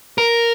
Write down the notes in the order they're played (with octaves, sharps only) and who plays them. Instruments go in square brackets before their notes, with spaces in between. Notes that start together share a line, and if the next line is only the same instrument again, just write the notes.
[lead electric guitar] A#4